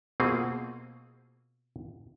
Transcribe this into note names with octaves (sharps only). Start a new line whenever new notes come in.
B2 A#3 C4 F4 G#4